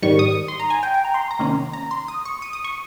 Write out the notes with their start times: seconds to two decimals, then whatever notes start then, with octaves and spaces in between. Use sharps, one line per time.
0.02 G#2 D#3 G3 C#6
0.19 D#6
0.48 C6
0.60 A#5
0.70 G#5
0.83 G5
0.94 G5
1.05 A#5
1.14 C6
1.31 A#5
1.39 C3 D#3 A#3 C#4
1.73 A#5
1.91 C6
2.08 D#6
2.25 C#6
2.42 D#6
2.53 D#6
2.64 C#6